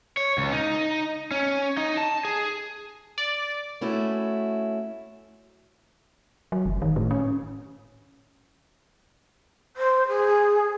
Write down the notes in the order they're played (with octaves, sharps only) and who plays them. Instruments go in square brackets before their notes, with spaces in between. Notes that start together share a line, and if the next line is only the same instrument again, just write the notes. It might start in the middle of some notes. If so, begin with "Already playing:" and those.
[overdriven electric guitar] C#5
C#2
D#4
C#4
D#4
A5
G#4
[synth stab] D5
[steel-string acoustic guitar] A3 C#4 E4 F#4
[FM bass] F#3
F#1
D#3
A2
C#4
[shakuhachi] C5
G#4